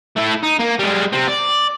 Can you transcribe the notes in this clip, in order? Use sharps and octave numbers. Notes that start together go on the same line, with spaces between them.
A3 E4
D#4
A#3
G3 G#3
C3 C4
D5